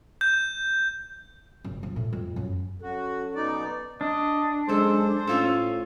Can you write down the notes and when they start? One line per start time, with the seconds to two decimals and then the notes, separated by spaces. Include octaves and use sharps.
0.21 G6
1.64 F#1
1.83 F3
1.96 A2
2.13 F2
2.36 F#2
2.82 F#3 C#4 F#4 A4
3.35 B2 D#4 D5
4.01 D4 D#5
4.69 F#2 G#3 A4 C5
5.27 A2 C#4 F4 A4